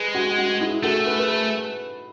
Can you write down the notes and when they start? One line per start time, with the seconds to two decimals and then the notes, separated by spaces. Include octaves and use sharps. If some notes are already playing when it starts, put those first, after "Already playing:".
Already playing: G#3 G#4 B4
0.15 F#4
0.38 F#4
0.61 E4 G#4
0.83 A3 F#4 A4
1.06 G#4 B4
1.19 B4